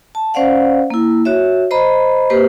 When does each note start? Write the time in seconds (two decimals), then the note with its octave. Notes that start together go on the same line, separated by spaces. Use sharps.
0.15 A5
0.34 C#4 C5 D5 F5 F#5
0.90 A#3 E4
1.25 F#4 C#5 E5
1.71 C5 D#5 A#5 B5
2.30 A#3 G4 B4 C5